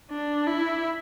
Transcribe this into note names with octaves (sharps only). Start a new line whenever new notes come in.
D4
E4